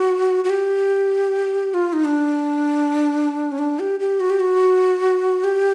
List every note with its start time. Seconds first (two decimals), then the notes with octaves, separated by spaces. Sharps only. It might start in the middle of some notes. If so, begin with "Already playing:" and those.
Already playing: F#4
0.44 F#4
0.50 G4
1.74 F4
1.93 D#4
2.05 D4
3.52 C#4
3.58 D4
3.79 G4
4.00 G4
4.20 F#4
4.30 G4
4.40 F#4
5.44 G4